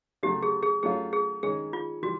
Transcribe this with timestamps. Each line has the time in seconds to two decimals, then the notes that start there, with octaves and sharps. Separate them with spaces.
0.23 C#3 F#3 A3 G4
0.43 G#4
0.63 G#4
0.83 F#3 A3 C#4 F4 G#4
1.13 G#4
1.43 D#3 G#3 C#4 G#4
1.73 F4
2.03 E3 G3 F#4